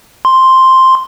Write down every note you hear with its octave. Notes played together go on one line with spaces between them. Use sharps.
C6